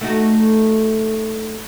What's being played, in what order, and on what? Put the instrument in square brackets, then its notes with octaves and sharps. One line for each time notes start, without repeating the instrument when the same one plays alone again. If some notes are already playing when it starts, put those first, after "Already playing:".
[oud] A3 D#4 F#4